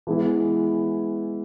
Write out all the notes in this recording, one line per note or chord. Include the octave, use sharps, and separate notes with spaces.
E3 G#3 B3 E4